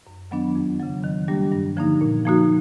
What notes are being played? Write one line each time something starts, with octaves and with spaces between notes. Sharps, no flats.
F#2
D#3 F#3 B3 D4
F2
C#3 F#3
D#3
G3 A#3 D4 G4
G2
D3 F3 A#3 D#4
A#2
F3 A#3 D#4 F#4